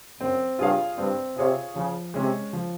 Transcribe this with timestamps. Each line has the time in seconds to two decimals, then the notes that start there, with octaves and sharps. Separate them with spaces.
0.20 F#2 C4
0.59 G2 F4 G#4 C#5 F5
0.98 G2 C4
1.37 C3 F4 G#4 C#5 F5
1.75 C#3 F3
2.14 C3 G#3 C#4
2.53 F3